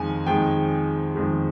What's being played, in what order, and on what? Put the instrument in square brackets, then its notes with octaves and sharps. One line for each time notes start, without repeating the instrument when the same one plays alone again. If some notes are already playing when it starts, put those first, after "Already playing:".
Already playing: [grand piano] F2 D#3 G#3 G#5
F2 D#3 G#3 G5
F2 D#3 G#3